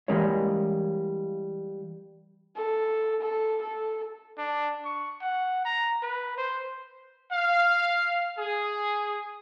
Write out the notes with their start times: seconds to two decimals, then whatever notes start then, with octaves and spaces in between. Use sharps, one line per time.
0.08 E3 G3 G#3 A#3 C#4 C#5
2.56 A4
3.22 A4
3.62 A4
4.37 D4
4.85 C#6
5.21 F#5
5.65 A#5
6.03 B4
6.37 C5
7.31 F5
8.38 G#4